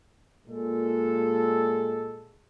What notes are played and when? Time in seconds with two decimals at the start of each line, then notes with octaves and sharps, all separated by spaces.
0.48 A#2 G#3 A4